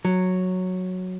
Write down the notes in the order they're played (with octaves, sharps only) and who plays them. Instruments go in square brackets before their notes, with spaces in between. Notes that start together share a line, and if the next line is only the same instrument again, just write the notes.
[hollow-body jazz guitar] F#3